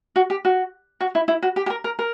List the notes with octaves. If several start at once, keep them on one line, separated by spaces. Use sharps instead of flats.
F#4
G4
F#4
F#4
E4
E4
F#4
G4
G4
A#4
A#4
A#4